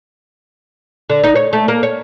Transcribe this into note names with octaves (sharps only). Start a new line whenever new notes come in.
D3
D#4
C#5
A3
A#3
C#5